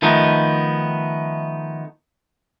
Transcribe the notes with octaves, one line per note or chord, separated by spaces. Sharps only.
D#3 F3 A3 B3 D#4